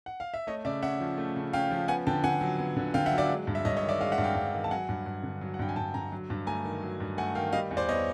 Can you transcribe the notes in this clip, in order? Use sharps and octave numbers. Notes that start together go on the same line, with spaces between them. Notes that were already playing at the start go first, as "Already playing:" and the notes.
F#5
F5
E5
A3 C#5 D#5
C#3 D5 E5
C#4 E5 F#5
F3
A3
C#3
C#4 F5 G5
F3
B3 F#5 G#5
D3 G5 A5
D3 F#5 G#5
F#3
B3
D3
D3 F5 G5
E5 F#5
F#3
D5 E5
G#3
G2
E5
G2 C#5 D#5
C#5 D#5
D#3
D5 E5
G#3 D#5 F5
E5 F#5
G2
F5 G5
G2
D#3
A5
F#3 F#5 G#5
G2
G2
D3
F#3
F#5
G2 G5
G#5
G2 G5 A5
D3 G#5 A#5
F#3
G2
A3 G#5 A#5
D#3
F#3
G2
A3 F#5 G#5
D#3 F5 G5
G3 D#5 F5
E2
C5 D5
B3 C#5 D#5